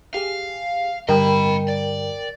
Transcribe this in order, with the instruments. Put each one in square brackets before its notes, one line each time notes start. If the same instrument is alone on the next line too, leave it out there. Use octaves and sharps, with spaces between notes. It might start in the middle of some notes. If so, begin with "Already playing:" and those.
[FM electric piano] G4 G#4 [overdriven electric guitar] F5
[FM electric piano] G2 D3 G3 [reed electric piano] A#4 G5 [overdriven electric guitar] D#5 B5
[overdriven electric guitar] D5